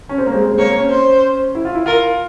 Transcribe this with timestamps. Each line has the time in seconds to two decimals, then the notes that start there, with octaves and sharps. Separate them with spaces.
0.09 C#4
0.18 C4
0.26 A#3
0.34 G#3
0.41 C4
0.50 G#3
0.58 A#3 C#5
0.68 C4
0.79 C#4
0.90 C5
1.55 E4
1.65 F4
1.75 E4
1.86 F4 A#4